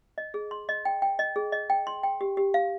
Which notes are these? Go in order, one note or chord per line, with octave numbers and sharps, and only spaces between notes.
D#5
G#4
C6
D#5
G5
G5
D#5
G#4
D#5
G5
C6
G5
G4
G4
F5